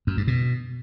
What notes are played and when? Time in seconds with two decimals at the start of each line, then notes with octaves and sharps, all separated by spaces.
0.07 F#2
0.17 G2
0.27 B2